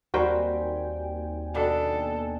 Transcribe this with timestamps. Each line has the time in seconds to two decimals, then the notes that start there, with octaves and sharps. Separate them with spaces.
0.14 D#2 G3 C4 F#4 A#4 C5 G5 G#5
1.55 B2 D4 A4 F#5